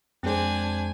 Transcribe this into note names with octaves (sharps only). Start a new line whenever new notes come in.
F2 G#3 C4 D4 G#4 C5 G#5